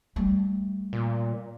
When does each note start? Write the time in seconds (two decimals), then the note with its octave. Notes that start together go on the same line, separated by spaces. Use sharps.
0.16 G3 A3
0.93 A#2